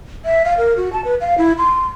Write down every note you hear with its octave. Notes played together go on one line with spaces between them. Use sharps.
E5
F5
A#4
F#4
A5
B4
F5
E4
C6